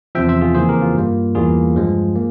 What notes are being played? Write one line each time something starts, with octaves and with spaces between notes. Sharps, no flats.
E2 C3 F3 E5 G5
C5 E5
F4 G#4
F2 C#3 E3 A#3 G#4 C5
G4 A#4
F4
G2 G3 A#3
E2 E3 G3 A#3 F4 G#4
G2 F3 G#3
A#3